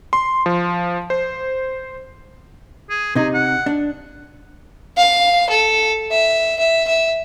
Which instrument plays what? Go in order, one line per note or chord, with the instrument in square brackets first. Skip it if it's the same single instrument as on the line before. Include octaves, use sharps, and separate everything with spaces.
[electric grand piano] C6
F3
C5
[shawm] G#4
[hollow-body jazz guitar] C3 D#4 [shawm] G#4
[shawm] F#5
[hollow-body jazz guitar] D4
[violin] F5
A4
E5
E5
E5